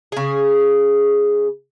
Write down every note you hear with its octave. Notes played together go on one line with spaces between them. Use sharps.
C#3 G#4